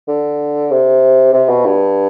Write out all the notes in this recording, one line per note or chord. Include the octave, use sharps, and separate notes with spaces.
D3
C3
C3
B2
G2